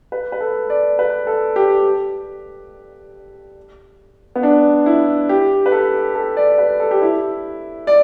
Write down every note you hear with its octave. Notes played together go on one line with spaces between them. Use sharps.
B4
B4
A4
D5
B4
A4
G4
B3
D4
E4
G4
B4
A4
A4
D5
B4
A4
G4
E4
D5